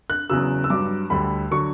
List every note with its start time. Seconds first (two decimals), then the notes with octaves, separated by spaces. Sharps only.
0.10 F#6
0.30 E2 C#3 F#3 E6
0.64 E6
0.70 G2 F#3 D6
1.10 D2 D3 G3 B5
1.51 D3 F#3 C#6